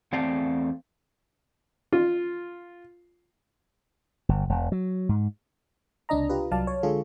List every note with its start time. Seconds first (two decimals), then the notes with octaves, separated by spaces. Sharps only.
0.13 E2 A3 C4 D5 F5 A5
1.93 F4
4.29 G1
4.49 E1
4.72 F#3
5.09 G#2
6.09 C#2 C3 D4 D#5 A#5
6.29 F4 G4 B4
6.51 C2 F#3 D5 F5 A5
6.67 C#5
6.83 D3 G#3 F4 G#4 A4